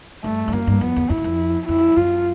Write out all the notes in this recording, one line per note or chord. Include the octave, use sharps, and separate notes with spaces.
G2 A3
G2
F#2 A#3
G2
F2 B3
E2
F2 E4
E2
F2
F2 E4
F#2 F4